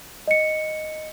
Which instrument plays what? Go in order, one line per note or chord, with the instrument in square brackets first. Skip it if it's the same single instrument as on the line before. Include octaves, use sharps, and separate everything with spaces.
[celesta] D#5 C#7